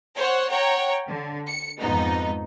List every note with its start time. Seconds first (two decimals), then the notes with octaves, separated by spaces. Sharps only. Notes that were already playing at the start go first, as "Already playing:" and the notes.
0.16 C5 C#5 F#5
0.50 C#5 F#5 G5 A#5
1.08 D3
1.48 C#7
1.79 F2 G#2 B3 D#4